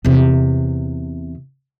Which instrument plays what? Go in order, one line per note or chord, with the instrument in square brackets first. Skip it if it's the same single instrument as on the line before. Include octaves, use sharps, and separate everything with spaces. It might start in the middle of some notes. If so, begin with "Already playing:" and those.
[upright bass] E2 C3